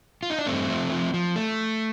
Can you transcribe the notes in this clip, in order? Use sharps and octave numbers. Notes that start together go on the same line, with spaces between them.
F4
D#4
D4
G2 A3 C4
F3
F3
F3
A3